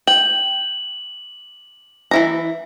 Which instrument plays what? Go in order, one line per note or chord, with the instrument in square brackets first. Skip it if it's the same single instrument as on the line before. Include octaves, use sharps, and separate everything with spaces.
[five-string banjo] G5 [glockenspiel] F#7
[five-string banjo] E3 E4 A#5